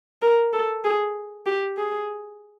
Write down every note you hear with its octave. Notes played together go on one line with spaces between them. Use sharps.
A#4
A4
G#4
G4
G#4